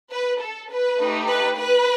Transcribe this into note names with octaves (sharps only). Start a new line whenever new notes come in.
B4
A4
B4
A3 D#4 G4
B4
B4